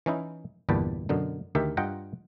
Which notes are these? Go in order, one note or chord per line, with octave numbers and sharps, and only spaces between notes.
E3 C#4 D#4 E4
G1 E2 A#2 G4 B4 A5
F#2 B2 D3 D#4
D2 D#3 G4 A#4 E5
G2 F4 D#5 F#5 G5 A#5